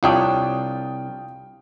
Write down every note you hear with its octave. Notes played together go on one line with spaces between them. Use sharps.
C2 D4 F4 C#5 G5 D#6